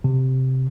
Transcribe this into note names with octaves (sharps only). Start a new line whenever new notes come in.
C3